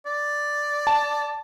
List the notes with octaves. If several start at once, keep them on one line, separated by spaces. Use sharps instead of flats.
D5
A5